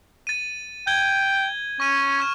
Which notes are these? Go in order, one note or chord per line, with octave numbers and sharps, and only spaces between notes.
A6 D#7
G5 G6 G#6 G7
C#4 C#6 D#7
C#6 F6 E7